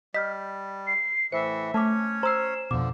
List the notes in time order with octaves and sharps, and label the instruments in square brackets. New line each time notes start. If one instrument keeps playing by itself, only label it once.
[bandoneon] G3 [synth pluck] D#5 [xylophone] F6 G6 B6
[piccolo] C7
[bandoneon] A2 E3 [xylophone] C5 [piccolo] E5 [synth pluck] C#7
[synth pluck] A3 [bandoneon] C#4 C#5 [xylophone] A5 D6
[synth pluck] C5 C7 [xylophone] A#5 E6 [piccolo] E7
[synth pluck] F2 B2 [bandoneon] D3 F3 [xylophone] D6